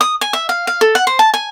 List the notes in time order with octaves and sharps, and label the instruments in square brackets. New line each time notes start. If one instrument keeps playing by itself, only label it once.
[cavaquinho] D#6
G#5
E5
F5
F5
A4
F#5
C5
A5
G#5